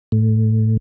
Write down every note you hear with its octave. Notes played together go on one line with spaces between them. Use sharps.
A2